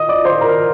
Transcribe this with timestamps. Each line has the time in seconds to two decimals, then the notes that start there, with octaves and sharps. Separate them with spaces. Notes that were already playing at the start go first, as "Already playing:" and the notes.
Already playing: D#5 D#6
0.09 D5 D6
0.25 C5 C6
0.41 A#4 A#5